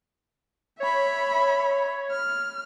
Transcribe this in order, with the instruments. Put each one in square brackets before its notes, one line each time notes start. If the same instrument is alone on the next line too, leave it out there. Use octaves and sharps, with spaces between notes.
[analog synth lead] C#5 [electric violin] E5 B5
[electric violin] F6